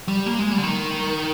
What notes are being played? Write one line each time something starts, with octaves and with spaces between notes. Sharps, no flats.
G3
A#3
G#3
G3
D3
D#3